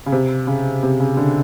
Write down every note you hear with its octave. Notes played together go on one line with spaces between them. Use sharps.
C#3
C3
C#3
C3
C#3
D3